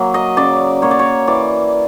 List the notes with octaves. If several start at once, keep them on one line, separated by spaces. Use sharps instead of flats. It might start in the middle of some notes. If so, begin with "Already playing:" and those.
Already playing: F#3 A#3
D#5
C#3 D5
F#3 A#3 C#5
D5
C#5
E3 D5